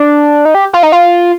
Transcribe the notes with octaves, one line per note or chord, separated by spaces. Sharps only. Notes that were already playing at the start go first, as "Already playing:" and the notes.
Already playing: D4
D#4
G4
F4
D#4
F4